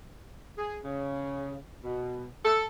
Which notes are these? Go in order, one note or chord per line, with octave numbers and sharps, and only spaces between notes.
G#4
C#3
B2
A4